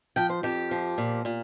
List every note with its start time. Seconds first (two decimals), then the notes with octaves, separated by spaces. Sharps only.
0.16 F3 G5
0.30 C5
0.43 F2 G4
0.71 F3
0.98 A#2
1.25 A#2